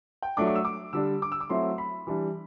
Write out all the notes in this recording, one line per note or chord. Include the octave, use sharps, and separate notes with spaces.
G5
F#3 A3 D4 D6
D6
E6
D6
D3 G3 D4 E6
D6
E6
D6
F#3 A3 C4 E4 C6
B5
E3 G3 D4